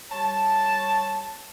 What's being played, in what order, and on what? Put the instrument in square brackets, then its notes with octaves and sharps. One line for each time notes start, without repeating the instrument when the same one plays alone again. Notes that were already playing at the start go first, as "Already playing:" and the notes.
[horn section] G3 C#5 A5